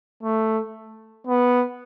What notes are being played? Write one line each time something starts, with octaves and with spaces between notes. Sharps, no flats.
A3
B3